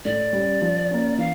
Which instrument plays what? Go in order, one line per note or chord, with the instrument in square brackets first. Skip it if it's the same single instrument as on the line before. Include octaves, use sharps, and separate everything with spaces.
[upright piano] A2 [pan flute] D5
[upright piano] G3 C#4
F3
A#3 C#4
[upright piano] E3 [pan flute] F5